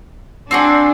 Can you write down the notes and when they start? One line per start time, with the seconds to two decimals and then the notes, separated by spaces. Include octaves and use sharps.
0.51 C4 D4 F#4 G#4